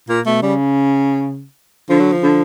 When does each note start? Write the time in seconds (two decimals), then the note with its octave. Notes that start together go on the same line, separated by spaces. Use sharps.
0.09 A#2 A#3
0.26 B2 A3
0.42 C#3 G3
1.89 D3 F3
2.00 F#3
2.12 F3
2.23 D3